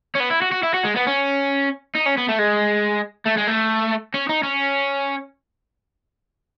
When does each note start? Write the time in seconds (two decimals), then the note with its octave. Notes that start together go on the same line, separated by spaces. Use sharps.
0.15 C#4
0.20 B3
0.30 E4
0.42 F#4
0.52 F#4
0.63 E4
0.74 F#4
0.85 G#3
0.96 B3
1.07 C#4
1.95 D#4
2.06 C#4
2.17 B3
2.28 A3
2.38 G#3
3.26 A3
3.37 G#3
3.47 A3
4.14 C#4
4.29 D#4
4.43 C#4